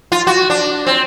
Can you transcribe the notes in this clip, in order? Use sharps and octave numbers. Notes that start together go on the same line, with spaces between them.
F4
F#4
D4
C4